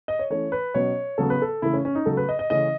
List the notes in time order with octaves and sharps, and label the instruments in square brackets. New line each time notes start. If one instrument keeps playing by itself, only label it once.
[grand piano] D#5
C#5
E3 A3 C#4 C#5
B4
B2 F#3 C#4 C#5
C#3 F#3 B3 A4
B4
A4
C#3 E3 A3 E4
C#4
C#4
D#4
C#3 F#3 A3 A4
B4
D#5
D#5
C#3 E3 A3 C#4 D#5